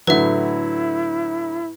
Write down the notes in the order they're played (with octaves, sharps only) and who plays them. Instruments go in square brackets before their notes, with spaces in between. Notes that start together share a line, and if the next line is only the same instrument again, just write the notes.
[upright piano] A2 D3 F#3 [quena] E4 [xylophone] B4 E5